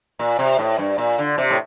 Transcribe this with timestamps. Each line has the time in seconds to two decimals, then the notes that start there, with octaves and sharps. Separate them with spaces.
0.19 A#2
0.39 C3
0.59 A2
0.78 G2
0.98 A#2
1.18 D3
1.38 C3
1.50 A2